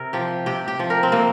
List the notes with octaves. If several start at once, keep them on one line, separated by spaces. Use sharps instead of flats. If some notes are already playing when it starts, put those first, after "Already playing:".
Already playing: C3 A#4
F3 G4
C3 G4
G4
F3
A#4
C4
C3 A#3